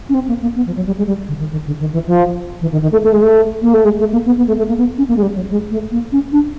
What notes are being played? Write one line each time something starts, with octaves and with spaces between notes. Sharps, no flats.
C#4
C4
A#3
A#3
B3
F3
F#3
G3
G#3
G3
D3
D#3
D#3
D3
D#3
E3
F3
E3
D#3
D#3
A3
A3
G#3
A3
A#3
A3
G#3
A3
A#3
B3
B3
A3
A3
A#3
B3
C#4
A#3
G#3
G3
F#3
G#3
A3
A#3
C#4
D4